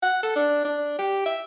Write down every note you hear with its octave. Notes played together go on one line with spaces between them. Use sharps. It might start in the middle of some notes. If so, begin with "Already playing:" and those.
F#5
A4
D4
D4
G4
E5